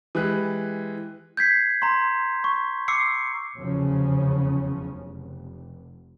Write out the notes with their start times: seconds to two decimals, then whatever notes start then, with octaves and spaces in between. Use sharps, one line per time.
0.15 E3 G#3 G4 F#6
1.37 G6 G#6 B6 C7
1.82 A#5 C6
2.44 C#6
2.88 D6 E6 C7 C#7
3.56 F1 E2 C#3 F3 F#3 C#4
4.87 F1